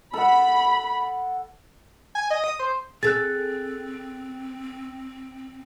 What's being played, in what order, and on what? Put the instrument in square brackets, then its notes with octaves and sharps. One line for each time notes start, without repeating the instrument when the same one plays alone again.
[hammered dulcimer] A4 F#5 [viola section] B5
[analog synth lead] G#5
D#5
D#6
C5
[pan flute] C4 [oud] G#4 A4 [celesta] F#6 A6